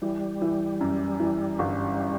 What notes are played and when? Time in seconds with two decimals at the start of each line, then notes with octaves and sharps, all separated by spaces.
0.02 E3 G3
0.42 E3
0.81 F#2
1.20 E3
1.59 G1